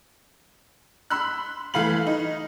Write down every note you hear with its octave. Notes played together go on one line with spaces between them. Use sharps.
B5 C6 E6 F#6
E3 A3 F5 B5 F#7
D#4